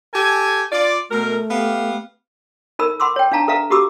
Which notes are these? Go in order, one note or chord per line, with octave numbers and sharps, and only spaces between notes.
G4 A4 G#5
F4 D5
B2 A3 F#4 A#4
B3 G4 F5
D#4 A4 A#4 B5 E6
F#5 B5 C6 D6 E6
C#5 G5
D4 D#4 F5 A5 A#5
A4 B4 E5 F5 A#5
F#4 G4 A4 B5 D6 E6